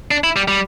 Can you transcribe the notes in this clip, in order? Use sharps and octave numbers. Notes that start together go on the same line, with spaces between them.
D4
E4
G3
G3